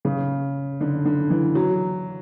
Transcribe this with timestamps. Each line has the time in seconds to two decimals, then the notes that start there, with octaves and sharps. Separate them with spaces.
0.05 C#3
0.81 D3
1.05 D3
1.30 E3
1.55 F#3